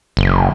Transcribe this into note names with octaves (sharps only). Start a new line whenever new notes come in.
F#1